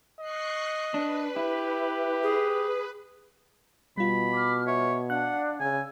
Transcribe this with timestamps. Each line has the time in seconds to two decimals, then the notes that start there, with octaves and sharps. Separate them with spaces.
0.20 D#5 C#6 F#6 C7
0.94 D4 B4
1.36 E4 G4
2.23 G#4
3.98 B2 G3 F4 B5
4.32 D6 F6
4.67 C#5 E5
5.10 D4 F5 F#5 F#6
5.60 C#3 G#5 E6